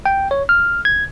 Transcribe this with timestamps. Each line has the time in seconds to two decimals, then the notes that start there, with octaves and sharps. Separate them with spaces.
0.06 G5
0.31 C#5
0.49 F6
0.85 G#6